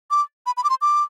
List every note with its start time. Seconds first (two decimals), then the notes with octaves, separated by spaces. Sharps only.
0.11 D6
0.46 B5
0.57 B5
0.64 D6
0.70 C6
0.82 D6